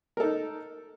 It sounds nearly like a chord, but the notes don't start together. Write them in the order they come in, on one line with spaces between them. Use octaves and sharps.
A#4 A4 D#4